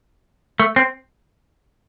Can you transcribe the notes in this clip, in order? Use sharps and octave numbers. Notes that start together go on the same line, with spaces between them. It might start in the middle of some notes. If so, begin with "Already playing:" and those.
A3
C4